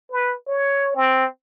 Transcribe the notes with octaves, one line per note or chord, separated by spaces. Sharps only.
B4
C#5
C4